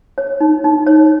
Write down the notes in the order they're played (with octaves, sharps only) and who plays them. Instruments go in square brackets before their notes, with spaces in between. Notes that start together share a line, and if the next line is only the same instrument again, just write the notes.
[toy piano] C#5
D#4
D#4
C#5